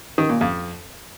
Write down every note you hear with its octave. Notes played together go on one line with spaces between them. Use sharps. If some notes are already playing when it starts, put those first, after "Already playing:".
D#3
A#2
F2